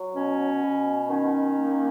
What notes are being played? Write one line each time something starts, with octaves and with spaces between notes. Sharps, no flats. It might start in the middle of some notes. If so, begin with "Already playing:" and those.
Already playing: F#3
B2 C#4
B2
D#3 C#4
A#3